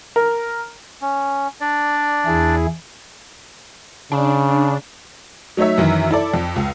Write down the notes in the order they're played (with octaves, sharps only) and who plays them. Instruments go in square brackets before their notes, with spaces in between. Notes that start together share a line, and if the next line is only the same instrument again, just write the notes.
[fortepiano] A#4
[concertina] C#4
D4 D5
[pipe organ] E2 E4 G#4
[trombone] C#3 [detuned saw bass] D4
[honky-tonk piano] F#3 A3 D#4 C#5 E5
F#2 D#3 E3 E5
E4 A4 D5
F2
C#2